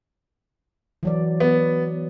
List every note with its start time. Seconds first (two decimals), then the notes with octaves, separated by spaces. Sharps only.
1.03 E3 F#3 D5
1.40 B3